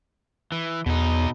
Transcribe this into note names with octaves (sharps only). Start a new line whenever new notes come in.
E3
E2 B2 D#4